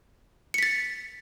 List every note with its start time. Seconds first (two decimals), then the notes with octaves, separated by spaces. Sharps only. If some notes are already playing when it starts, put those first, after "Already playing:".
0.54 C#7
0.58 B6
0.63 A6